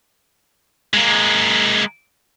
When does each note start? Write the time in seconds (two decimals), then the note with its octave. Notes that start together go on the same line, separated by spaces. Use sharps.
0.93 G#3 A#3